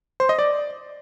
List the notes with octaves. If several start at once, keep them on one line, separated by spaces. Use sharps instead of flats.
C5
D#5
D5